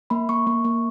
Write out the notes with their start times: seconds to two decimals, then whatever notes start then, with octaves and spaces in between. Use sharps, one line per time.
0.10 A#3 B5
0.29 A#3 C#6
0.47 A#3
0.64 A#3